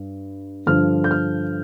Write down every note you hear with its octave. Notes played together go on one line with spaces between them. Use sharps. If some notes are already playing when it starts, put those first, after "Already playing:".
Already playing: G2
G2 D3 F3 F6
G6
F6